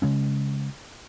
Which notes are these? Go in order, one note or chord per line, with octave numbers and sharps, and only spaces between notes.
C#3 G#3 C#4